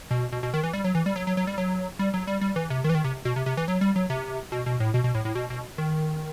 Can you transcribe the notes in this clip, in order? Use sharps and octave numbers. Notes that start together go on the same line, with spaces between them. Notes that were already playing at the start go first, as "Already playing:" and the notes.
B2
B2
B2
D#3
E3
G3
F#3
E3
G3
F#3
F#3
F#3
G3
F#3
G3
F#3
G3
G3
E3
C3
D#3
E3
D#3
C3
B2
C3
C3
E3
F#3
G3
F#3
C3
B2
B2
A2
B2
B2
A2
A2
B2
B2
D#3